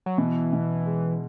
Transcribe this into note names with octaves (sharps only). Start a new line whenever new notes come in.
F#3
B2 E3
B2
G#3